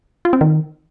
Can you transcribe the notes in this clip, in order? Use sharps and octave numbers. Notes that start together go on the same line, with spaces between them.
F4
C4
D#3